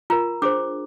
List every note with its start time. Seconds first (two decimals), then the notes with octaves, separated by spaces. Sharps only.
0.10 F4 A#4 A#5
0.42 D4 G#4 C5 D6